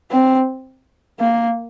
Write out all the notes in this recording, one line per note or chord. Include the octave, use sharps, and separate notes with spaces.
C4
A#3